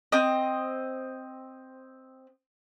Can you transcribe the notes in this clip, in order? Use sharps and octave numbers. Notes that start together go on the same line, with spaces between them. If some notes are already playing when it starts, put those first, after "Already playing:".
C4 D#5